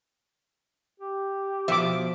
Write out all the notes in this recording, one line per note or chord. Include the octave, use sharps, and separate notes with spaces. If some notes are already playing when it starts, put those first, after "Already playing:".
G4
B2 F3 E5 D6